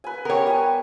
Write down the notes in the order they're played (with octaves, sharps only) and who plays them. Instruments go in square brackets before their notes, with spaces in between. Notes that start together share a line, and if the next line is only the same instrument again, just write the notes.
[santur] B4 G#5
[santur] B3 G4 [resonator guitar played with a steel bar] A#4 C#5
[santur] G3 G#5